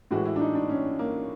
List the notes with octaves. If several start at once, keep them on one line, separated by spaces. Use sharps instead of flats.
A2 E3 G#3 F#4
E4
D4
D#4
D4
C#4
A#3